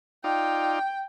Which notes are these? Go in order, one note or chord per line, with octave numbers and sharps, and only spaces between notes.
D#4 F4 D5 G5